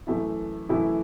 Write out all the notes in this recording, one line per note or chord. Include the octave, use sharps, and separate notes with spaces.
F#2 E3 A3 E4
F#2 E3 A3 E4